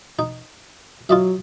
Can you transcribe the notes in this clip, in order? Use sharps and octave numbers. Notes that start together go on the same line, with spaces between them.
D#4
F#3 F4 D#5 E5